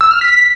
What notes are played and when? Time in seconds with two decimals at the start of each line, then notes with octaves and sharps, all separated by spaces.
0.01 E6
0.11 F6
0.21 B6